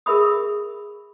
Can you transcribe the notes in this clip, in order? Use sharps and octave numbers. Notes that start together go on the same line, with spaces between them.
G#4 A#4 E5 B5 D#6